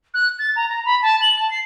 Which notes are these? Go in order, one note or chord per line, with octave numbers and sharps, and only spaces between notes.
F#6
A6
A#5
A#5
B5
A5
F#7
A5
C7